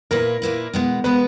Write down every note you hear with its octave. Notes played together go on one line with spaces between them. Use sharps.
A#2 A#3 E4 A#4 B4
A#2 A#3 E4 B4
B2 G#3 B3
B2 G#3 B3 B4